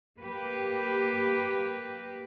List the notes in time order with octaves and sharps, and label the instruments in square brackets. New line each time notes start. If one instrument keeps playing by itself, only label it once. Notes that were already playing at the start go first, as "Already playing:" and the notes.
[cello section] A#3 G4 B4